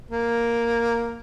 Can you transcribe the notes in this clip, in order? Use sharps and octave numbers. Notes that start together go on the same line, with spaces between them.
A#3